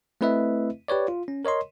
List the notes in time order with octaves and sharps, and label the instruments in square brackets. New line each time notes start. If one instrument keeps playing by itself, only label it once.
[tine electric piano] A3 C4 E4 B4 D#5 E5
G4 B4 C#5 D5
F4
C#4
A#4 C#5 D#5 C6